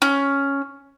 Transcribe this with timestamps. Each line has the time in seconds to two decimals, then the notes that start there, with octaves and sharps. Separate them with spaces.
0.02 C#4